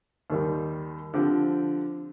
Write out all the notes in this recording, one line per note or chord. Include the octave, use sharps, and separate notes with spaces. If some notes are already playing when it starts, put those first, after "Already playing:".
D#2 D#3 G3
D3 F3 C4 G4